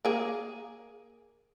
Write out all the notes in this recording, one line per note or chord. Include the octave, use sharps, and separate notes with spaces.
A#3 G#4